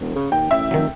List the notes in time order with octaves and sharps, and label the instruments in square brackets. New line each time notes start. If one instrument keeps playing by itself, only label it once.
[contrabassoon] E1
C#3
[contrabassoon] D#2 [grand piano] G5
[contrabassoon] A1 [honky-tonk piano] E5
[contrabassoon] F1 [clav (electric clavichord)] D#3 F#3